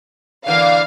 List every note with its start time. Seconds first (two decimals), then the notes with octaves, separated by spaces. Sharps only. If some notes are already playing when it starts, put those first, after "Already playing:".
0.46 D3 E3 A#3 F5